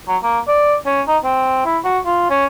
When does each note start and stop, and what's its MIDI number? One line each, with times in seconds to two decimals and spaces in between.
0.08 0.17 54
0.23 0.39 58
0.48 0.76 74
0.86 1.02 61
1.08 1.18 63
1.24 1.63 60
1.65 1.78 64
1.85 1.99 66
2.06 2.30 65
2.30 2.46 61